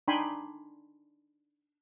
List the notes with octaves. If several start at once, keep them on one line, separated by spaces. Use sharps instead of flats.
D4 D#4 G5 G#5 B5 C6